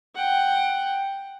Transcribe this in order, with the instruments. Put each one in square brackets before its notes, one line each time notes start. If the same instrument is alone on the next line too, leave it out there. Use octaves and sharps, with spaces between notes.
[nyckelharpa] F#5 G5